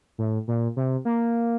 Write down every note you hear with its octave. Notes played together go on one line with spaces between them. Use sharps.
A2
A#2
C3
A#3